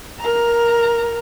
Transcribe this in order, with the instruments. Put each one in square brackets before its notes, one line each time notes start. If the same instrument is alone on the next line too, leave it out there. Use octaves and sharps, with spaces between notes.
[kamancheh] A#4 A#5